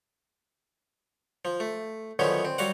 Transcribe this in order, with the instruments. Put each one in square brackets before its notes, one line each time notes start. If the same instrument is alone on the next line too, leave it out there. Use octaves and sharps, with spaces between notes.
[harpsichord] F3
A3
D3 D#3 F3 F#3 B3 C#4
C4
F#3 G3 F#4 F5 F#5